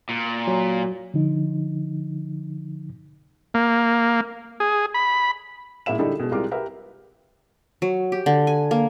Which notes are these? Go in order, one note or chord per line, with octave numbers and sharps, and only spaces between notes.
A#2
F#3
D3 F3 D#4
A#3
G#4
B5
A#2 G#3 E4 E5 E7
D3 G3 G#3 D#4 E4 A4
B2 G#3
C2 G3 G#3 F4 A#4 D6
G4 A#4 B4 E5
F#3
G4
D3
G#5
A#3